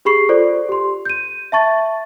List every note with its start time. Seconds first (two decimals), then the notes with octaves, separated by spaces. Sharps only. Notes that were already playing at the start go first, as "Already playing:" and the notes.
0.05 G4 G#4 B5 C#6 C7
0.29 F4 A4 C5 D5
0.69 G4 C6
1.05 G6 D#7
1.52 E5 A5 C#6 A6